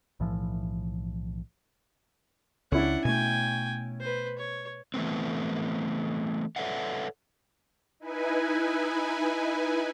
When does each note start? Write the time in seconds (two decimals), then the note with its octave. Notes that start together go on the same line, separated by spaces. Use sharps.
0.20 B1 A2 E3 F3
2.72 C#2 C#4 D4 E4 F#5
3.05 B2 A3 G5 G#5
4.00 B4 C5
4.38 C#5
4.94 E3 A3 B3 C4
6.56 A4 B4 C#5 D5 E5 F#5
8.00 D#4 E4 B4 G#5